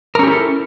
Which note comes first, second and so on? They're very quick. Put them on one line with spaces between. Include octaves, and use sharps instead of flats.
A#4 C#4 G4 E4 A4